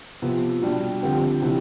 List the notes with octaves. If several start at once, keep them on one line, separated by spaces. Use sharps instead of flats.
C3 F3 B3 F4
B2 G3 D4 G4
D3 F3 C4 G4
C3 E3 G3